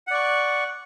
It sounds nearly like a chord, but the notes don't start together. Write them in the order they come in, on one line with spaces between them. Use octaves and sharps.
F#5 D5 C#6